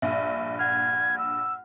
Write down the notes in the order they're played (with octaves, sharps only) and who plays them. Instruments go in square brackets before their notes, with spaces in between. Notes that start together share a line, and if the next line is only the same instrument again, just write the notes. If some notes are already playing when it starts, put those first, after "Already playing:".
[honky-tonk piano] A#1 G2 [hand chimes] E5
[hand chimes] F#5 F6 [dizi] G#6
[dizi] E6